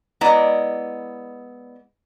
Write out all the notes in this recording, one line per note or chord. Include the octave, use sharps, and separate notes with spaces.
G#3 B3 E4 D5 D#5 A#5